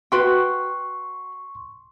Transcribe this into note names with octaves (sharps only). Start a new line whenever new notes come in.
F#4 B4 G5 C6 C#6